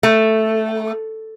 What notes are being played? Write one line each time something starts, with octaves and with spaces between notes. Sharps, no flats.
A3